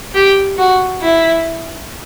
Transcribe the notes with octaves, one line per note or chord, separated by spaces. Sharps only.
G4
F#4
E4